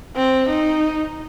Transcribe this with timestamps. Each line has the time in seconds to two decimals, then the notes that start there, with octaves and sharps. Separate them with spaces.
0.16 C4
0.49 D#4